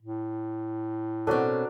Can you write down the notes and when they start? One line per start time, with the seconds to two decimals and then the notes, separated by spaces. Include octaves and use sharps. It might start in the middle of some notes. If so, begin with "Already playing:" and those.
0.02 A2
1.27 B2 C4 D4 F#4 A4 A#4 C#5